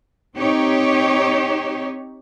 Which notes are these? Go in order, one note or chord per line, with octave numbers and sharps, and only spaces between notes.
C4 D#4 G4 C#5